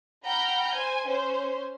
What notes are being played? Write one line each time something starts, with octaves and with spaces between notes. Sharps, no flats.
F#5 G5 A#5 B5 F6 G6
C5 G#5
C#4 C5